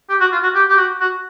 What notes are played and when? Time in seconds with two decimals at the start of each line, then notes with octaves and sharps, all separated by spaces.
0.10 G4
0.20 F#4
0.32 F4
0.43 F#4
0.55 G4
0.69 G4
0.78 F#4
1.00 F#4